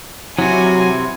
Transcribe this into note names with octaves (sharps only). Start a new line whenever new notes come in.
C3 F#3 E4 F#4 G#5